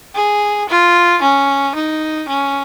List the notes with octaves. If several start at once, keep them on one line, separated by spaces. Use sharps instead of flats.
G#4
F4
C#4
D#4
C#4